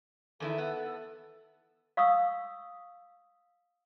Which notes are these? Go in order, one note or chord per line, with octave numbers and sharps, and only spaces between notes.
E2 D#3 E4 A4
B3
F5 C#6 D#6 E6